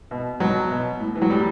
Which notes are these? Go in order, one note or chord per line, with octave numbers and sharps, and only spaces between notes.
B2
B2 F#3
B2
A2
E3
F#3
A2 G3